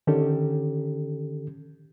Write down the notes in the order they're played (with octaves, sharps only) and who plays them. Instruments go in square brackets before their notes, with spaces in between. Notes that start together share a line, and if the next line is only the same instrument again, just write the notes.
[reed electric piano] D3 D#3 C#4 G4 A4